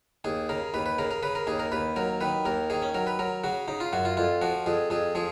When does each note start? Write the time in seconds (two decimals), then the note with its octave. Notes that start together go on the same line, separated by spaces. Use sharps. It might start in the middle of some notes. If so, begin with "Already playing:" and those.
0.24 D#2 G#4
0.49 C#3 A#4
0.74 D#2 B4
0.86 B4
0.98 C#3 A#4
1.11 A#4
1.23 C#3 B4
1.35 A#4
1.47 D#2 G#4
1.59 A#4
1.72 D#2 B4
1.96 F#3 A#4
2.21 D#3 B4
2.45 D#2 A#4
2.70 D#3 G#4
2.82 C#4
2.94 F#3 A#4
3.07 B4
3.19 F#3 A#4
3.44 C#3 F#4
3.68 C#3 D#4
3.80 F4
3.93 F#2 F#4
4.05 F4
4.17 F2 F4
4.41 F3 F#4
4.66 F2 G#4
4.90 F2 G#4
5.15 F3 G#4